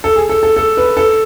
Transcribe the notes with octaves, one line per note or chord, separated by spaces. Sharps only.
A4
G#4
A4
A4
A4
B4
A4